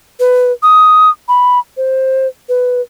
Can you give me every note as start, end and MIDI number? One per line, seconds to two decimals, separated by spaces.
0.20 0.52 71
0.63 1.10 87
1.29 1.59 83
1.77 2.27 72
2.49 2.81 71